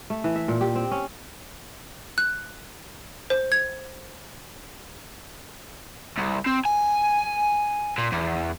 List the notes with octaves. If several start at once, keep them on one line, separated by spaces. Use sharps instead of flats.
A3
E3
E5
A#2
G4
C4
C#4
F#6
C5
G#6
C2
C4
G#5
A#2
E2